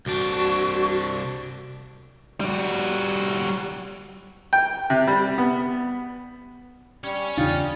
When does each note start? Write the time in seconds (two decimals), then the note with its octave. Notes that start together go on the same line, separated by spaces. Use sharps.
0.06 C2 D4 F#4
2.41 G3 F#4
4.53 G5
4.90 C3
5.07 G3
5.38 B3
7.04 G3 C#4 C#5
7.37 E2 C#3 G3 D4 D#4 F4